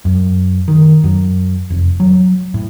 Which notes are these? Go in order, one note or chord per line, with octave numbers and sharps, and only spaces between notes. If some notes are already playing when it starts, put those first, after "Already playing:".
F#2
D#3
F#2
F1
F#3
A2